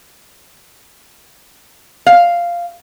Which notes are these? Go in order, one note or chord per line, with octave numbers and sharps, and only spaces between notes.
F5